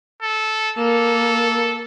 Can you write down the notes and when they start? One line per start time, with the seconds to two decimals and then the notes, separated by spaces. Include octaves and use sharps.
0.22 A4
0.77 A#3 A4